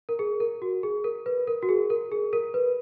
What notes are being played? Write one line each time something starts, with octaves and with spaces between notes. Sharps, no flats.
A#4
G#4
A#4
F#4
G#4
A#4
B4
A#4
F#4
G#4
A#4
G#4
A#4
B4